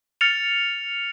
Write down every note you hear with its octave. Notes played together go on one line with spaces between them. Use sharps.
F6 A6 C#7 F7